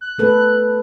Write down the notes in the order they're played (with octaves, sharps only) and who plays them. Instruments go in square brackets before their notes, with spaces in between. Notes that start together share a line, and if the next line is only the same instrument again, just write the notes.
[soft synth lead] F#6
[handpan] A3 A4 B4